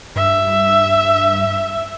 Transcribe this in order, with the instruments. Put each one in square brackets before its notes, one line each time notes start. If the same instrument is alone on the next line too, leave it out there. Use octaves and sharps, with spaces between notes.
[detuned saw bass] G2 [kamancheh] E5